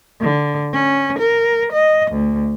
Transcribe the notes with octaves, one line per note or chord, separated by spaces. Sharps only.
D3
C#4
A#4
D#5
D2